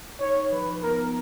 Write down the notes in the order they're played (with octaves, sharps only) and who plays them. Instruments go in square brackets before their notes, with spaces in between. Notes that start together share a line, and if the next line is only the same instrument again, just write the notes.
[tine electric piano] D#4 [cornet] C#5
[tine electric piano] D#4
[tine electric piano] F3 [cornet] B4
[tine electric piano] F3
[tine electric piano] B3 [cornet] A#4
[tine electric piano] B3